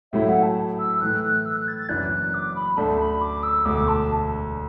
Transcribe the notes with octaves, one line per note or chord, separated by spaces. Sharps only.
A2 F#3 A3 E4 E5
F#5
A5
E6
A2 E3 A3 F#6
F#6
E6
F#6
A6
A6
F#1 F#2 E3 D4 F#6
F#6
D6
B5
D2 D3 A3 D4 A5
B5
D6
E6
E1 D2 D3 A3 D6
A5